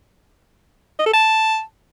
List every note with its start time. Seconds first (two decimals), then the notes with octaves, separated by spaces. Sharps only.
0.99 D#5
1.06 A4
1.14 A5